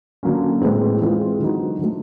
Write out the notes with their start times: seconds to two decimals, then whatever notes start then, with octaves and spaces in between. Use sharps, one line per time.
0.23 D3 F#3 A#3 C#4
0.61 A2 E3 G#3 C4
1.01 E3 G#3 C4 F4
1.40 D3 F#3 B3 D#4 F#4
1.79 D3 F#3 A3